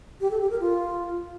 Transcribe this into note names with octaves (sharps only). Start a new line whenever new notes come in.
G4
A4
G4
A#4
F4